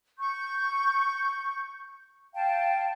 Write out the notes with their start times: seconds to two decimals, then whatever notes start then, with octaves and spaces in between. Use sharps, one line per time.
0.19 C#6 G6
2.35 F5 G5 A5